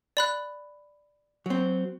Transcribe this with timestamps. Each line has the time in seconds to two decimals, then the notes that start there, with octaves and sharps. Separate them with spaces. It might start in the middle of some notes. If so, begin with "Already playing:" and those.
0.17 D5 B5 F#6
1.46 F#3 C4